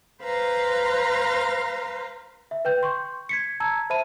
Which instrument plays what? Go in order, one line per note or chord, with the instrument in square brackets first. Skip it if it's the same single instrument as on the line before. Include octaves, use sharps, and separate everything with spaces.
[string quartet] B4 C5 F5 A#5 C6
[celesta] E5
B4 G5 G6
C6 C#6 G6
G#6 B6 C#7
A5 A#5 E6 G#6
C5 E5 A5 B5 D#7